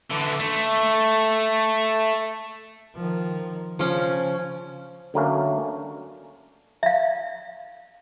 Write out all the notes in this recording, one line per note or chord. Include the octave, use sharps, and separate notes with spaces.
D3 E3
A3
D#3 F3
C#3 F3 C#4
D2 D3 F#3 A3 A#3 C#4
E5 F5